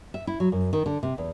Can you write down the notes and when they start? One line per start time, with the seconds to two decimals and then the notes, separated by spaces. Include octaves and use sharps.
0.14 E5
0.27 E4
0.40 F#3
0.52 F#2
0.73 D#3
0.86 D3
1.03 C3
1.18 E2